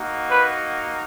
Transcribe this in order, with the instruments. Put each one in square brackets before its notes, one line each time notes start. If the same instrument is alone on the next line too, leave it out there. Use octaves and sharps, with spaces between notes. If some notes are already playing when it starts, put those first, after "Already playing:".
Already playing: [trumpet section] A#3 D#4 F#4
B4